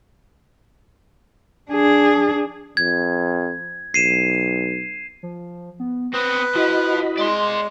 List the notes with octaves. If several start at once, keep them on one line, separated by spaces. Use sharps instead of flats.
D4 G#4
F2 G#6
B1 C7 D#7 E7
F3
B3
B3 C4 B4 D#6
F3 E4 F#4 D#5 B5
G#3 D5 C6